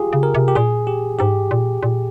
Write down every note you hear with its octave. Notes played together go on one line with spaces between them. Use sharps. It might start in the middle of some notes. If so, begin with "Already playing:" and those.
Already playing: F4 G4 G#4
C#3
A#4
C3
G4
A#2 G#4
G4
G#2 G4
A#2
A#2